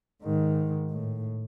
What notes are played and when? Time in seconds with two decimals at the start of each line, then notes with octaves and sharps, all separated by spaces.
0.23 G#2 D#3
0.91 A2